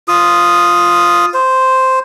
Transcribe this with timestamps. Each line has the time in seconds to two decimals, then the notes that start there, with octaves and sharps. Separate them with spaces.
0.08 F4 D#6
1.34 C5